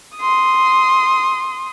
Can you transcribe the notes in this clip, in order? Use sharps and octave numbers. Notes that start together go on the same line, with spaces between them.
C6 D#6